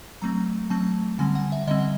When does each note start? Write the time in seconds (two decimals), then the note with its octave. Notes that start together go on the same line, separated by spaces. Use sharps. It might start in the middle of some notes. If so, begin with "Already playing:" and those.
0.22 F#3 A3 C4 A#5
0.70 F#3 A3 C4 A5
1.19 D3 G3 C4 G#5
1.35 F#5
1.52 E5
1.67 D3 G3 C4 D#5